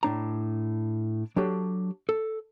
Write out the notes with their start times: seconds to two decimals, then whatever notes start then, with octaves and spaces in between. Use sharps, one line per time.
0.03 A2 D4 A#5
1.36 F#3 D4 G4 A4
2.09 A4